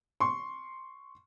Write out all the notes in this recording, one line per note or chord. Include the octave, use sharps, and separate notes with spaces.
C6 C#6